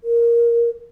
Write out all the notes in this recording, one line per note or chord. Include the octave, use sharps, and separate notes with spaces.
A#4